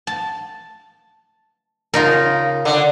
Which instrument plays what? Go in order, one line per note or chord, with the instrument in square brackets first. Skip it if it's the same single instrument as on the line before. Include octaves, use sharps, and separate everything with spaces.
[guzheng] A5
[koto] C#3 D#4 [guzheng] F4 A#4
[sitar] D3